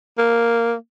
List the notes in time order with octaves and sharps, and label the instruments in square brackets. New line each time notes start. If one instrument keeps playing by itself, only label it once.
[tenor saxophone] A#3